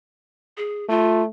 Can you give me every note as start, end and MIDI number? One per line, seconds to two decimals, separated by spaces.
0.57 0.87 68
0.89 1.26 57
0.89 1.23 65